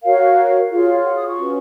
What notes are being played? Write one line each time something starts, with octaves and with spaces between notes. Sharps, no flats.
F#4 A#4 C#5 F5
F4 G#4 C#5 F5
F#5
D#6
C#6
C#4 F#4 B4